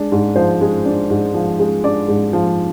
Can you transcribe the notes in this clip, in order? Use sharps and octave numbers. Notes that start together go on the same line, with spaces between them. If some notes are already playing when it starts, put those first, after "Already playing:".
Already playing: G#3 D4
G#2
F3 C5
G#3
D4
G#2
F3
G#3
D4 D5
G#2
F3